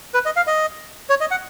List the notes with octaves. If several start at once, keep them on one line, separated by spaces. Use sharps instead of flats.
B4
D#5
F5
D#5
C#5
D#5
F#5